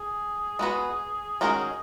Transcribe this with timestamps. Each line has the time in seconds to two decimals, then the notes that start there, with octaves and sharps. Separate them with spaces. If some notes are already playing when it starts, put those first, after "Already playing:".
Already playing: G#4
0.59 G#3 B3 F#4 B4
1.41 D#3 G#3 C#4 F#4 A#4